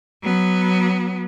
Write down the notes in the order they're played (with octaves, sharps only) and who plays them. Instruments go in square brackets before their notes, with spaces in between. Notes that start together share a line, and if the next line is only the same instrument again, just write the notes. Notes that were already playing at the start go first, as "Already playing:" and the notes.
[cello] F#3 B3